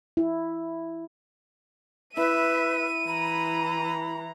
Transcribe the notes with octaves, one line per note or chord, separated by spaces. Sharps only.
E4
E4 B4 E5 D#7
E3 A#5 B5